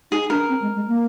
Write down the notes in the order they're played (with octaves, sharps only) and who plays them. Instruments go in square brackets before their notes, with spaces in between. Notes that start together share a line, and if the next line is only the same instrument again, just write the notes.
[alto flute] D#4 [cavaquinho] G#4
[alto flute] D4 [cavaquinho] A#4
[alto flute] C4
G#3
G#3
A#3